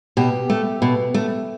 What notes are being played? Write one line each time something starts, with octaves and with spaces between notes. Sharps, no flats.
B2 G4
A3
B2
A3